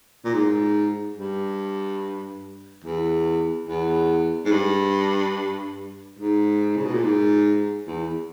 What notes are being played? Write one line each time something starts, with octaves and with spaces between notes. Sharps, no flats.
A#2
G#2
G2
E2
E2
G#2
G2
G#2
C#3
B2
A#2
G#2
E2